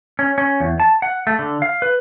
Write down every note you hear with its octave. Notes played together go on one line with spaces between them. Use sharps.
C#4
C#4
E2
A5
F#5
A3
D3
F5
B4